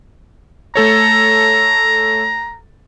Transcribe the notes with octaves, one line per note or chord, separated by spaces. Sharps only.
A3 A4 C#5 A#5